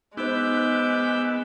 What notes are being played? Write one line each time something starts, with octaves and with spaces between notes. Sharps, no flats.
G#3 B3 D#4 C5 D6 E6 G6